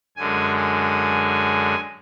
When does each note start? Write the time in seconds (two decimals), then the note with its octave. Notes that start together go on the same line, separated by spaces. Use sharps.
0.16 F#2 D3 G#3 G#5
0.56 G#5